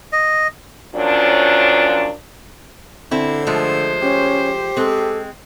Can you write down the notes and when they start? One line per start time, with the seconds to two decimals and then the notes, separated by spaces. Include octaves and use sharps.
0.13 D#5
0.95 A#2 F3 F#3 C#4 D4
3.11 D3 C4 E4
3.47 F3 G#3 A3 C5
4.02 C#4 G4
4.77 G#3 C4 A4